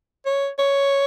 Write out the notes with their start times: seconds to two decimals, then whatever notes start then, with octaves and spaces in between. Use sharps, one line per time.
0.26 C#5
0.59 C#5